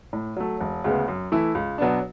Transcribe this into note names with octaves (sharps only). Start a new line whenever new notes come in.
A2
F#3 A3
E1
D2 C#3 G#3 B3
F#2
E3 A3 E4
C#2
B2 F#3 B3 D4